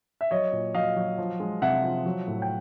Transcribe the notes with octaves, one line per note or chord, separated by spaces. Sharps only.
E5
F#3 C#5 D#5
A#2
F#3 D#5 F5
F#3
F3
G#3
C3 E5 F#5
F3
F#3
A2
G5